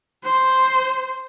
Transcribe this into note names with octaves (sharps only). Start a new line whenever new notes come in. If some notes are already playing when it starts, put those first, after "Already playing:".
C5